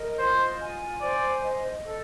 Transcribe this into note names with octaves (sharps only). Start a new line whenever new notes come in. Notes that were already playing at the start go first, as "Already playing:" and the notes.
Already playing: A#4 D#5
F4 C5
G#5
C5 D5
D#5
A4